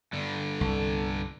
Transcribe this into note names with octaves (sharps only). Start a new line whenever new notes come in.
G2 D3
C2 A4